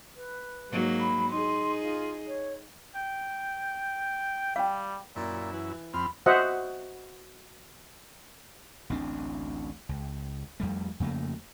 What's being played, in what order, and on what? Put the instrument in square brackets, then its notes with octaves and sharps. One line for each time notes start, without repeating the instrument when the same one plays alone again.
[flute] B4
[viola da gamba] G#2 F#3 A#3
[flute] B5
[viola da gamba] D#4 G#4 [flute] C6
[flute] F4
C#5
[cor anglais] G5
[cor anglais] G3 [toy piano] F5 G5
[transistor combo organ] F#2 E4 [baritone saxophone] A#2
[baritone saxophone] E3
[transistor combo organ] F2 C4 F6 [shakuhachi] B5
[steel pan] F#4 C5 D#5 E5 F#5
[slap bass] A1 D2 C4 D4
C#2
F2 G3 A3
F2 C#3 A3 A#3